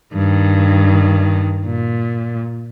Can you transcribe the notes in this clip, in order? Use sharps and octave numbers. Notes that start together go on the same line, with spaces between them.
G2 D#3
A#2